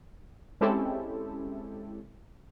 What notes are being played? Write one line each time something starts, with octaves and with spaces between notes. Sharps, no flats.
G#3 C4 C#4 E4 G4 A4